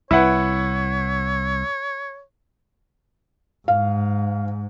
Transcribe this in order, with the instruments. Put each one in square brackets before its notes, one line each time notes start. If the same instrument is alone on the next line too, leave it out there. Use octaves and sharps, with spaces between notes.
[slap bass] C2 [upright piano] E4 B4 F#5 [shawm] C#5
[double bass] G#2 [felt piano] F5